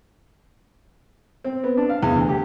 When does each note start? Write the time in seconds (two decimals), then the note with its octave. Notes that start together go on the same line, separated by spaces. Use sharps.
1.44 C4
1.64 B3
1.77 D4
1.89 F5
2.03 E2
2.16 D2
2.29 G4